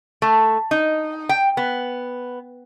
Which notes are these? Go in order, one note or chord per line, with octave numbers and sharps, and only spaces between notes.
A3
D#4
G5
B3